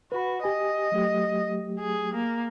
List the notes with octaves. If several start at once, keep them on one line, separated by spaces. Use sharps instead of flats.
F#4 B4 B5
G4 D#5 G#5
F#3 A3 G4
G#4
A#3